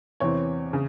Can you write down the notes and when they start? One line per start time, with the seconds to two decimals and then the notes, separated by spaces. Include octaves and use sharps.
0.20 E2 C3 E3 C4 C#5
0.73 C#3